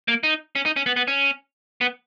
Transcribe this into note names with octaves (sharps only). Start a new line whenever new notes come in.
A#3
D#4
C#4
D#4
C#4
B3
B3
C#4
B3